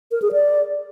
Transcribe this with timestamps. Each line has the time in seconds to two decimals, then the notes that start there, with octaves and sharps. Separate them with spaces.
0.11 A#4
0.22 G#4
0.32 D5